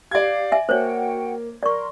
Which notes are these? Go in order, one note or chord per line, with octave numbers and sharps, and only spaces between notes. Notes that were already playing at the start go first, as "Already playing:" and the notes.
G4 D5 F5 G#6
E5 G#5
A#3 F#4 C5 C#5 F#5 G5
A#4 D5 C6 C#6